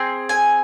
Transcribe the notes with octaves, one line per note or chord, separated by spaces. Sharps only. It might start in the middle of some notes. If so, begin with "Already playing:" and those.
Already playing: C4 G#4
G#5